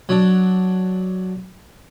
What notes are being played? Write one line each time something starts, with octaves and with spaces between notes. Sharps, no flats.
F#3 D4